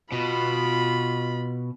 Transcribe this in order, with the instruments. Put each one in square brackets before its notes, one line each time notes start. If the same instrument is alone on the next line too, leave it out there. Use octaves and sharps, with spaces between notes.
[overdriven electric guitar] B2 [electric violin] F4 B5